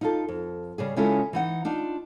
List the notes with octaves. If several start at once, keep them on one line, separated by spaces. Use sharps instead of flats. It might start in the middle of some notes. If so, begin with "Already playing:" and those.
D#4 F4 A4
F2
C#3 G3 G#4
C#3 G#3 C#4 E4 F4 A4
E3 D#4 F#5
D4 D#4 F4